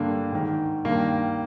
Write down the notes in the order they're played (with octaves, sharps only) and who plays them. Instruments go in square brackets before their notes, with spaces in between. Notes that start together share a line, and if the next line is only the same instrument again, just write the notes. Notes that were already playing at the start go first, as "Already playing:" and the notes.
Already playing: [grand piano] G2 D3 A#3
G#2 D#3
G2 D#3 A#3